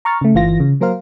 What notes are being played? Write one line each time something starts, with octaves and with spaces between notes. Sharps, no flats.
A#5 C#6 F6 A6
C#3 A3
G1 E3 F4 A#6
C#3
F#3 A#3 A#4 C5 F5